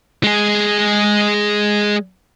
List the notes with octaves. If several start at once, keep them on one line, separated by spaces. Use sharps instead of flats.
G#3 G#4